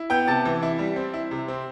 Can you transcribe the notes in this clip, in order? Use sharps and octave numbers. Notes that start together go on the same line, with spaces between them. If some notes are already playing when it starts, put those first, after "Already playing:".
Already playing: E4
B3 G5 G6
C3 A5 A6
E3
E4
G3
C4
E4
C3
C4